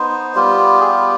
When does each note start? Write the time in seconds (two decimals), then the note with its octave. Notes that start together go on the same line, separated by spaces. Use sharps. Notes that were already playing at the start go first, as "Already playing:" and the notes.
Already playing: B3 D#4 C5
0.35 G3 B3 F4 G4
0.80 G#4
0.88 G4